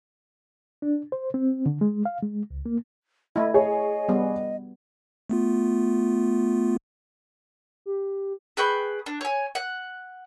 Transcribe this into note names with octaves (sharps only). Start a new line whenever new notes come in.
D4
C5
C4
D3
G#3
F5
G#3
C#2
A#3
A3 E4 D#5
G#4 C#5 D#5
G3 B3
A3 B3 F4
G4
G#4 B4 G5 C#6
D4
C#5 G#5
F#5